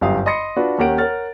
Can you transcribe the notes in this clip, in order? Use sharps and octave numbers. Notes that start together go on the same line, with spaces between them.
G1 F#2 G4 F5 D#6
D#5 B5 C6 A#6 C#7
D4 F4 F#4 B4
D#2 C#4 G4 A#4 F#5 D7
A#4 C#5 F#5 F6 A6